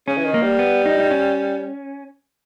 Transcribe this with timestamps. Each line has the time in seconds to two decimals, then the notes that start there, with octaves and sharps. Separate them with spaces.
0.08 C#3 C#4
0.17 E3
0.25 D#3
0.34 A#3
0.42 G3
0.59 B3
0.86 D#4
1.00 D#4
1.11 C#4